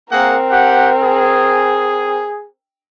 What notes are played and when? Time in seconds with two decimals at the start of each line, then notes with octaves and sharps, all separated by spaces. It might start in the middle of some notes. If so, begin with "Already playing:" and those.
0.11 A#3 C4 G#4 A#4 F#5
0.51 G4 F#5
1.02 G#4